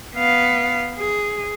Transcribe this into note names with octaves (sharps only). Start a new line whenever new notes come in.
B3 F5
G#4